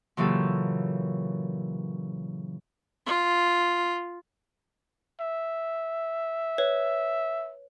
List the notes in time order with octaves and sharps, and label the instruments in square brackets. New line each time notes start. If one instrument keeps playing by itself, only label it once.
[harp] A#2 C#3 E3 F#3 G4 A4
[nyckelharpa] F4
[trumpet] E5
[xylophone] B4 C#5